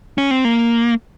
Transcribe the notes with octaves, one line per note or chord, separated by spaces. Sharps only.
C#4
C4
A#3